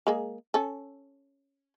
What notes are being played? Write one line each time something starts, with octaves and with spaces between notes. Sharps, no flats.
G#3 A#3 G#4
C#4 A4